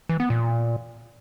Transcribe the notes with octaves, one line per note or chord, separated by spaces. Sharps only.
E3
B3
A#2